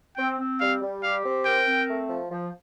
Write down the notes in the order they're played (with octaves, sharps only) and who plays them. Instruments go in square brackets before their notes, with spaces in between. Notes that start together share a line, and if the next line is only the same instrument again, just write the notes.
[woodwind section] C4 [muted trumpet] G5
[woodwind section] C4
[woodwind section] G3 [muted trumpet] F5
[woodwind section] G3
[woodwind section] G4 [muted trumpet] F5
[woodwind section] C4
[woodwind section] A#4 [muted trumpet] G5
[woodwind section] C4
A3
F3
F3